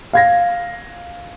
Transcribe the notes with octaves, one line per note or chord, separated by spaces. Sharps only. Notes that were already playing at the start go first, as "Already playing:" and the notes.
F5 G#6 A#6